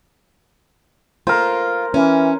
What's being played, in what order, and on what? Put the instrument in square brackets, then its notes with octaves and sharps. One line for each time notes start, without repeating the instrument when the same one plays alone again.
[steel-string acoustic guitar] F4 [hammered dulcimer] A#4 C5
[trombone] E3 [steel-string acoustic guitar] C#4